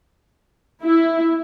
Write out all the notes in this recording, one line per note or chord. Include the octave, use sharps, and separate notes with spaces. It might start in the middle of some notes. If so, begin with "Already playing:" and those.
E4